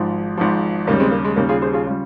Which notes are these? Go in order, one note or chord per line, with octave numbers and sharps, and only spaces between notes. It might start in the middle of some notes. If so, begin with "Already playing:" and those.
Already playing: G#1 G#2 F3
G#1 G#2 F3
D#2 C#3 G3 A#3
G#3 C4
A#3
G#3
D#2 C#3 G3 A#3
F4 G#4
G#4 C5
F4 G#4
C#3 G3 C#4 F4